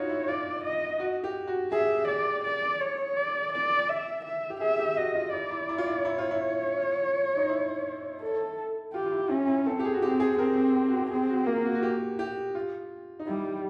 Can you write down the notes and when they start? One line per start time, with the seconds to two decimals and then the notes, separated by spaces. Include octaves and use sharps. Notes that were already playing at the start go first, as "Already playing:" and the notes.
Already playing: D#4 F4 F#4 C#5
0.09 E4
0.28 F4 D5
0.64 D#5
0.99 F#4
1.24 G4
1.48 F#4
1.72 G#4 E5
2.08 D5
2.45 D5
2.81 C#5
3.16 D5
3.53 D5
3.89 E5
4.25 E5
4.50 G4
4.61 G#4 E5
4.79 G4
4.96 F#4 D#5
5.15 F4
5.33 E4 D5
5.51 E4
5.69 E4
5.78 F4
5.87 E4
6.05 E4 C#5
6.18 F4
6.31 E4
6.78 F4
7.37 D#4
7.49 E4
8.21 A4
8.94 F4 G4
9.06 F4
9.12 E4
9.30 C#4 E4
9.48 E4
9.66 C4 A4
9.79 G4
9.84 G#4
9.93 F#4
10.02 C4 G4
10.20 G#4
10.38 C4 A#4
10.88 F#4
10.99 G4
11.10 C4 G#4
11.29 F#4
11.46 A#3 F4
11.65 F#4
11.75 F#4
11.83 G4
12.19 G4
12.55 F4
13.19 D#4
13.27 G3 E4